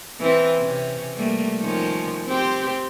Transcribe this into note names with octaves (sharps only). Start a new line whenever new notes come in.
E3 C4
C3 C#4
G3 A3 A#3
D#3 F3 C#4
C4 G4 C5